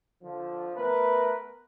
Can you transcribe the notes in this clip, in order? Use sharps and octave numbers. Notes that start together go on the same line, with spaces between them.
D3 F3
A3 B3 A#4 B4